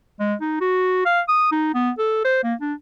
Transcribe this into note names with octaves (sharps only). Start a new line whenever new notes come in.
G#3
D#4
F#4
F5
D#6
D#4
B3
A4
C5
A#3
D4